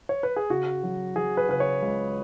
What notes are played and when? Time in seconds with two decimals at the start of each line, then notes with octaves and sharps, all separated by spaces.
0.09 C#5
0.23 B4
0.36 G#4
0.50 C#3 F#4
0.83 F#3
1.16 F#3 G#4
1.37 B4
1.49 C#3 B4
1.60 C#5
1.82 C#2